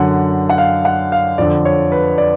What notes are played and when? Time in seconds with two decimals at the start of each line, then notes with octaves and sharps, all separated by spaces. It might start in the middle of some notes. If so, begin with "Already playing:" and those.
Already playing: F#2 D3 F#5
0.49 F#5
0.58 F5
0.85 F#5
1.12 F5
1.38 F2 D3 D5
1.65 C#5
1.92 B4
2.18 D5